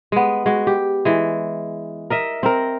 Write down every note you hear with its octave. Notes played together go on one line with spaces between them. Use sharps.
G#3 B3
G#3 F#4
G4
E3 G#3
A#4 D#5 E5
C4 A#4